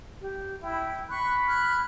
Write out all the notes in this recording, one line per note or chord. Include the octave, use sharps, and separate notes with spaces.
G4
E4 G5
B5 C#6 F#6
F6 F#6 G#6